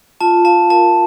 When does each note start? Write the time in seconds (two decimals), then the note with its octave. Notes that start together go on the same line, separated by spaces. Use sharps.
0.21 F4 A5
0.45 F5 A5
0.70 A#4 A5